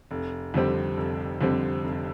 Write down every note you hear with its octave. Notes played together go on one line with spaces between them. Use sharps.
F1
F2 D3 G3 C4
F1
F2 D3 G3 C4
F1